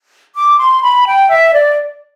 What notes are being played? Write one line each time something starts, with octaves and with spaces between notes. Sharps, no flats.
D6
C6
B5
G5
E5
D5